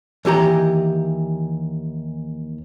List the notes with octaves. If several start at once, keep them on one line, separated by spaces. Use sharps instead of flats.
D#2 E3 G4 A#5